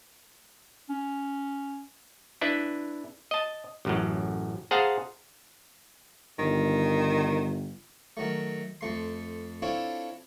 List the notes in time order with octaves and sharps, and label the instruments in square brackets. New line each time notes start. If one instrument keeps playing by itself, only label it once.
[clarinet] C#4
[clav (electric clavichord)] D4 E4 B4
D#5 A5
A1 F#2 A2
G#4 C5 F5 F#5 A5 A#5
[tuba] G1 [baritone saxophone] D#3
[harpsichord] D#3 F#3 A3
F2 A3 C6
C4 D4 E4 F4 A4 C#5